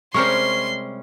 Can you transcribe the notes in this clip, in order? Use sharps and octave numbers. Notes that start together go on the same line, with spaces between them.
C3 G3 G#3 C#4 A#4 C5 C6 C#6